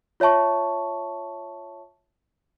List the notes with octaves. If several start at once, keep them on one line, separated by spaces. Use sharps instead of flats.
F4 C#5 E5 A5 C#6